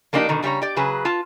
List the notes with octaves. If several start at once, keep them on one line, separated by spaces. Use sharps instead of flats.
F3 A#3 B3 D4 D#4 G4
B2 D3 D#3
C#3 G3 D4 C#5 A#5
G4 D5
C#3 F#3 G#4 B4
F4 A5